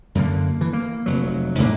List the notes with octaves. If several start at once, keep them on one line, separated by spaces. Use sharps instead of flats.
F#2 D3 A#3
E3
A#3
F1 F#3
A1 G#2 A#3 D4